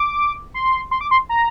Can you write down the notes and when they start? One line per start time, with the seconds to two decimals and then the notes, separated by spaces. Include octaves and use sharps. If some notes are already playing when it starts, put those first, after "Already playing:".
Already playing: D6
0.54 C6
0.91 C6
1.01 D6
1.11 C6
1.29 A#5